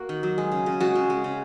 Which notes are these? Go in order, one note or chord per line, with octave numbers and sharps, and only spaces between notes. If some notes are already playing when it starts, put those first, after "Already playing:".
Already playing: A#3 F#4
D#3
F#3
G#3
C#3
C#3
G#3 F#4
C#3
G#3
C#3